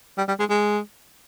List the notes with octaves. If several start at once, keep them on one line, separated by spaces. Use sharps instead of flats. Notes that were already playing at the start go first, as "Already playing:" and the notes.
G3
G3
G#3
G#3